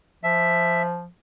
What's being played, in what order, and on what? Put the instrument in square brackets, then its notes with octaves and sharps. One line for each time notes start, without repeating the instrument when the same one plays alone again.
[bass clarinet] F3 [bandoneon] E5